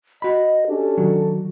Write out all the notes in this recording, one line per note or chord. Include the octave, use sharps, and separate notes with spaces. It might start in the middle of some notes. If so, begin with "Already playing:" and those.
F#4 D#5 B5
C#4 D4 G4 A4
D#3 F#3 F#4